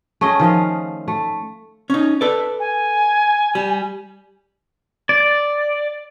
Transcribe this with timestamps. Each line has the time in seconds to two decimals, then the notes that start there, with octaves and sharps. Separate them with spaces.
0.21 A3 C#4 G#4 D#5
0.40 D#3 F3 D#5 F5
1.08 A3
1.90 C#4 D#4
2.21 A4 B4 D5
2.59 G#5
3.55 G3
5.09 D5